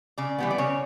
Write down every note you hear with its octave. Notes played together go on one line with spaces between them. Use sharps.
C#3 D5
E3 G3 B3
D5
C#3 C#5